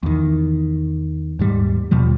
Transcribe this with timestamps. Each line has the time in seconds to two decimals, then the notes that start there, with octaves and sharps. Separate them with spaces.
0.03 E2 D#3
1.39 D#1 G#2 G3
1.91 D#2 B2 F3 G3